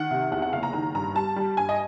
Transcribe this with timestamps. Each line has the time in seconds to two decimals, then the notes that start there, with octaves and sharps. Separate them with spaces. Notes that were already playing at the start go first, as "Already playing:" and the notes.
Already playing: D#3 F#5
0.11 C3
0.31 E2 F#5
0.42 F#5
0.53 F#1 F5
0.63 A#5
0.73 D#3 A#5
0.95 G2 A#5
1.15 G3 A5
1.36 G3
1.57 G2 G#5
1.69 D#5